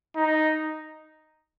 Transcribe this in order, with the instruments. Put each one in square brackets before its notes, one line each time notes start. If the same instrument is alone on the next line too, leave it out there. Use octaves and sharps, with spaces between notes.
[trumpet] D#4